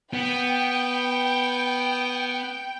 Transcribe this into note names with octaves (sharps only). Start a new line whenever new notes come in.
B3 G5